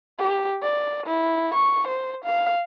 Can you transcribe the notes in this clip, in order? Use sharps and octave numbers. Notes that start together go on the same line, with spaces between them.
G4
D5
E4
C#6
C5
F5